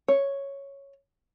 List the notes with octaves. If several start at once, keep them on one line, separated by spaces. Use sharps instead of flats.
C#5